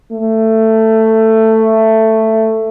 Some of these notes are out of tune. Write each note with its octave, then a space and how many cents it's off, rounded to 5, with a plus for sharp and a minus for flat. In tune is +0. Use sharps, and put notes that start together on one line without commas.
A3 +10